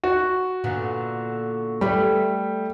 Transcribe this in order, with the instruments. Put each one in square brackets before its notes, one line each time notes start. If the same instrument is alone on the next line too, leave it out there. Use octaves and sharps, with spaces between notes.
[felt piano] F#4
[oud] A#2 D3 B3
[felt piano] G3 [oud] A3 B4